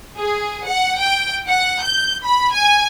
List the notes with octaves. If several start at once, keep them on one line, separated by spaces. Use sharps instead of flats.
G#4
F#5
G5
F#5
G6
B5
G#5